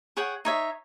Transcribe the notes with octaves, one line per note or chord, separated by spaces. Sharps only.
G#4 C#5 F#5 G5
D#4 C#5 E5